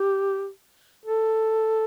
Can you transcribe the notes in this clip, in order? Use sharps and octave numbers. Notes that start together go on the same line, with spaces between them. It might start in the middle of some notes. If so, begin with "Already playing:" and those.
Already playing: G4
A4